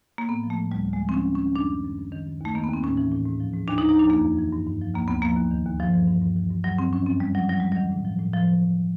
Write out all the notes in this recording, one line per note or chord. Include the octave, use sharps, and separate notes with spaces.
A#3
A2 B3
F3
A3
A2
D2 G3
D2
G#3
F3
C4
D2 C#4
D2
C#4
D#3
F#2 D4
D#3
F#2
F#2
D#3
F#2
D#2 A3
D#3 A#3
B3
D#2 C4
A2 C#4
E3
A2
G#2
F3
G#2
D#2 D4
D#4
D#2
D#4
F3 D4
F2 A#3
F2
E3
G2
G2
F3
D2 A#3
D2 B3
F3 A#3
D#2
D#3
D#2
G2 F3
E3
G2
G2
E3
G2
G2 F#3
G2 C4
F3 C#4
F#2 C4
F#2 G3
F3 F#3
E2 F#3
E2 G3
D#3 F#3
A2
F3
A2
A2 F3
E3
A2